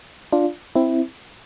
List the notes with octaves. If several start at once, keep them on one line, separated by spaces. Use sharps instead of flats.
D4 F4
C4 E4